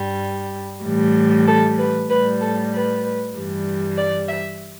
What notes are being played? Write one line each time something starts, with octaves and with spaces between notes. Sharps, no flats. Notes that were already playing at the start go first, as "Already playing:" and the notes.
Already playing: G2 G3
A2 E3 G3
A4
B4
A2 G3 B4
A4
B4
G2 E3 G3
D5
E5